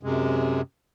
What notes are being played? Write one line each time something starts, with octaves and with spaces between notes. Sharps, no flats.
F#2 C3 G#3